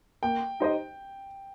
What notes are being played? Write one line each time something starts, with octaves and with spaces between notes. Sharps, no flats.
A#3 G5
D#4 G4 C5 D#5